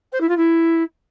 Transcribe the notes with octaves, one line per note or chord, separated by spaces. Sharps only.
C5
E4
F4
E4